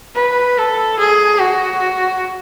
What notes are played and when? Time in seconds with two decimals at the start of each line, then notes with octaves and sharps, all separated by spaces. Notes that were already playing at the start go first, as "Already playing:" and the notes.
0.15 B4
0.57 A4
0.99 G#4
1.40 F#4